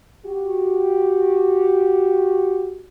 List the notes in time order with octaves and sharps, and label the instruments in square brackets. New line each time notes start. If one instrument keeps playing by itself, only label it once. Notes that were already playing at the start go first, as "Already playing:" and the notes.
[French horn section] F#4 G4